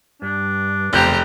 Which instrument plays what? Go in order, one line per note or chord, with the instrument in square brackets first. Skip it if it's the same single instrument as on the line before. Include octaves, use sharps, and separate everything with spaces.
[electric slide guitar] G2 [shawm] D4
[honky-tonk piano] F1 F#6 G6 [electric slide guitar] E2 C#3 C5 [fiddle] G4 A#5